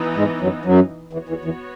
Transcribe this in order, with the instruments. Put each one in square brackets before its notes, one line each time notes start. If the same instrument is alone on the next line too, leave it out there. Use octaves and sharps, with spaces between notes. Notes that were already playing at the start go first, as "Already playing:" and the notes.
Already playing: [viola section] E3 B3 D#4
[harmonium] G#2 G#3
F#2 F#3
F#2 F#3
[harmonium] E2 E3 [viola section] B3 F#4 C#5
[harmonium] E2 E3
E2 E3